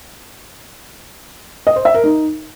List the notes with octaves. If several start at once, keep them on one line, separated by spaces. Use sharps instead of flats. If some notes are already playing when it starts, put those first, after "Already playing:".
D#5
C5
E5
A#4
D#4